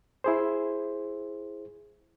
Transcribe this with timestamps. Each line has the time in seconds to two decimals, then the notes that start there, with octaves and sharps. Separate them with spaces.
0.24 E4 G#4 C5